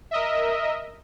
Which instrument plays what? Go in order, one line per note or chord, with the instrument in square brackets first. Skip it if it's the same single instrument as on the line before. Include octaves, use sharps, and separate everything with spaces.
[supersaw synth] A#4 D#5 E5